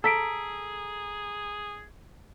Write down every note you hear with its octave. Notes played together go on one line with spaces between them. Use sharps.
G#4 A4 A#5 E6 B6 D7